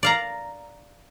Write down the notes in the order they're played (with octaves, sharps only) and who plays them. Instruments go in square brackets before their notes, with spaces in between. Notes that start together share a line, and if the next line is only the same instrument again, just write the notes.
[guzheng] D5 F5 A#5